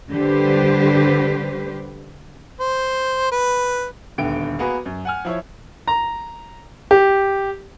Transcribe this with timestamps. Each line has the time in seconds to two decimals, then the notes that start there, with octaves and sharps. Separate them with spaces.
0.11 D3 G3 G4 B4 C5
2.60 C5
3.32 B4
4.18 D#1 D2 D3 B3 G5 D7
4.59 A#3 B3 F#4 G#4 A#4 B4
4.86 F#2
5.05 F#5 G#5 F6
5.25 F3 E4 C#5
5.88 A#5
6.91 G4